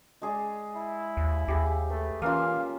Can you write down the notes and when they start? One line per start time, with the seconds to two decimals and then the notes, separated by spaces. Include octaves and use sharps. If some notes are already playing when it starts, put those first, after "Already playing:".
0.22 G#3 G#4 D5
0.76 E4
1.17 D#2
1.48 D#2 G4 G#4
1.90 A3 B4
2.22 E3 A#3 C#4 F4 F5